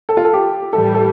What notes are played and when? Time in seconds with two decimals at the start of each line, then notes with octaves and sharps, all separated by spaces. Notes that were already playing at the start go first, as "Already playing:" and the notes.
0.09 A4
0.17 F4
0.25 A4
0.33 G4
0.73 A2 E3 G3 A4
0.94 A4